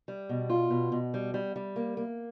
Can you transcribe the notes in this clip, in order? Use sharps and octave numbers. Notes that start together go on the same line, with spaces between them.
G3
B2
F4
B2
B2
G3
G3
G3
A#3
A#3